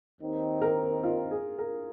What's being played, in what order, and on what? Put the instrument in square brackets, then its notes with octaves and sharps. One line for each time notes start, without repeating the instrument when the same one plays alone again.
[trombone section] D#2 D#3 C4 D#4
[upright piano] A#4
F4
G#4
A#4